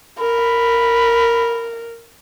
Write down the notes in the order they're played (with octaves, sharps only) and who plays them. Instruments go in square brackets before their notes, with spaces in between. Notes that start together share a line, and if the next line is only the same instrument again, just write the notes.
[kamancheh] A#4 [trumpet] B5